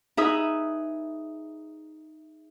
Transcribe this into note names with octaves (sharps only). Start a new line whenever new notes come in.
D#4 G#4 B4 E5 D#6